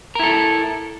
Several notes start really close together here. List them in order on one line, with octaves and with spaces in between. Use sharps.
A#4 E4 A4